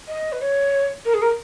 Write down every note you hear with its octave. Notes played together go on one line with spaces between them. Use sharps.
D#5
B4
C#5
A#4
G#4
A#4